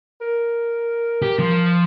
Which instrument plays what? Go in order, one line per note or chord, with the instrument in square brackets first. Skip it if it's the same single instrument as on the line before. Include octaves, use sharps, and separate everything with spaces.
[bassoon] A#4
[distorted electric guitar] G4
F3